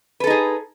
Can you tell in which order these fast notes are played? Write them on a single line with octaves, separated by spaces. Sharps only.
B4 A4 D#4 G#4